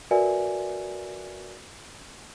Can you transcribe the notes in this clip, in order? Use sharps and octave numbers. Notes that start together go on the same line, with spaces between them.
F#4 A#4 B4 D5 E5 G#5